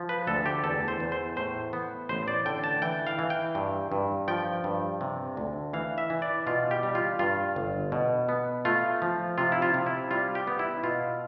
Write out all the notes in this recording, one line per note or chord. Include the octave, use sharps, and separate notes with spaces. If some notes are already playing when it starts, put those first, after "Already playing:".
Already playing: F3
B4
D2 A4
G4
E2 A4
C5
E2
C5
A2 C5
B3
A1 C5
D5
D3 G5
A5
E3 G5
F5
E3
G5
G2
G2
F3 G5
G2
C3
D2
E3 F5
E5
E3
D5
B2 F4
G4
G3
F4
G2 F4
G1
B2
B3
A3 F4
F3
C3 F4
E4
F4
C3
E4
G3 F4
G4
B3
E4
B2 F4